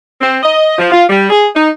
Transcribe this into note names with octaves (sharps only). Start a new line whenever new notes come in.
C4
D#5
F3
F4
G3
G#4
D#4